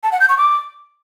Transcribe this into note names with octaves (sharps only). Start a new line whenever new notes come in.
A5
F#5
G6
C#6
D6